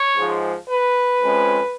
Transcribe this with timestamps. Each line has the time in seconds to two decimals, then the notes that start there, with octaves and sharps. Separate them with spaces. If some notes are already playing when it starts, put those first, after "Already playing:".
Already playing: C#5
0.17 G#2 F3 G#3
0.69 B4
1.21 F2 F3 G#3 C#4